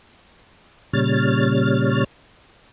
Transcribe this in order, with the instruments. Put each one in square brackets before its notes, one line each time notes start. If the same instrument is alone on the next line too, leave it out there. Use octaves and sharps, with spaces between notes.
[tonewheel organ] A#2 C#3 G3 C#5 F6 A6